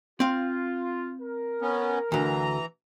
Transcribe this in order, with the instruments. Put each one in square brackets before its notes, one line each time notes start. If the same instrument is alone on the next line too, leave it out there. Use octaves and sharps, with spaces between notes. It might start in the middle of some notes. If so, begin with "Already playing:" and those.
[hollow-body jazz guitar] C4 F5 [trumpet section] F4
[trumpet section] A#4
[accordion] B3 C#4
[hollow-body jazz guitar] D2 D3 [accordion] E3 A#5